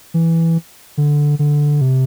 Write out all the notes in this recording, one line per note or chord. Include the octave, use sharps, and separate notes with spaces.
E3
D3
D3
C3